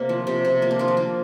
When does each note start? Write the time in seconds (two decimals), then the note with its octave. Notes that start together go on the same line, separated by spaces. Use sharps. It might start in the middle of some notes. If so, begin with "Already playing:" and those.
Already playing: C3 A#3
0.09 F3
0.27 C3 G4
0.45 C3
0.62 A#3 F4
0.71 D4
0.79 F3 F4
0.88 D4
0.97 A#3 F4